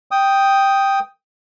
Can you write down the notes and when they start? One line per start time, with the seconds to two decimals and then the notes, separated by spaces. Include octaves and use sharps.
0.11 G5 D#6